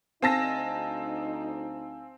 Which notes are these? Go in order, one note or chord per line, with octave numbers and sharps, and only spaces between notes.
D2 C4 D#4 F5 G#5 A5 E6 A#6